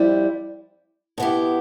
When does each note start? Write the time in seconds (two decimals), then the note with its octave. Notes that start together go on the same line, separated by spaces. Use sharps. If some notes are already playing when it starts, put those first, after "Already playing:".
Already playing: F2 G3 E4
1.18 B2 B3 E4 G4